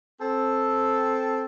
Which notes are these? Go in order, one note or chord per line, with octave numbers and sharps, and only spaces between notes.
C4 A4